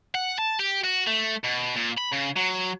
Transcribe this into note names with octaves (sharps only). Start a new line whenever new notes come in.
F#5
A5
G4
F#4
A3
B2
A#2
B5
C#3
F#3